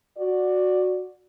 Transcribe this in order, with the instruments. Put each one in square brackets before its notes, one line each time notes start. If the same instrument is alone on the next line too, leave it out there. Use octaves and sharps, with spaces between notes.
[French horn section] F#4 D5